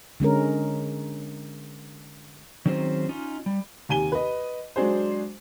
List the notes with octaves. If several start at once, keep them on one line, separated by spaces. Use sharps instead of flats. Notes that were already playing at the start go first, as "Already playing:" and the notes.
D3 G#3 C#4 A#4
D#3 F#3 C4 C#4 G#4 C5
C#4 D#4 F4
G3
D#2 C3 G#5 D#7 G7
B4 D#5
F#3 G#3 D4 F#4 G#4 C5